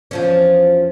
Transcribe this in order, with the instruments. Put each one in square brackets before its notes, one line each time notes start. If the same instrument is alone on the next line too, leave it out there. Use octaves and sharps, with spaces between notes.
[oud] E2 F3 C#4